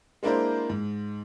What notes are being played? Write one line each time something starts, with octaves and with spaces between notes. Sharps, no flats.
G#3 A#3 D4 E4 A#4 C5
G#2